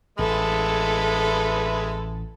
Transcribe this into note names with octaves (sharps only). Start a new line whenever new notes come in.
A1 G#3 A4 B4 E5